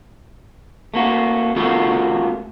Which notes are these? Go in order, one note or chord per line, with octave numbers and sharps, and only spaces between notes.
A3 A#3 F#4
A3 C#4 F4 F#4 A4 A#4